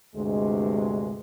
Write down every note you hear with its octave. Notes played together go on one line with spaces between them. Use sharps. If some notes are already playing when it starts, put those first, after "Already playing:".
D2 G2 C3 G#3